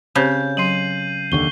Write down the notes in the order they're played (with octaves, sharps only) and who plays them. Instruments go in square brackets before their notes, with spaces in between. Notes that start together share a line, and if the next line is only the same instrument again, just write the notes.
[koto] C#3 [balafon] C4 G4 C5 [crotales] G6
[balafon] F#3 C6 [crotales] C7 D#7 F#7
[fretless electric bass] F1 D#2 D3 [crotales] C#6 G7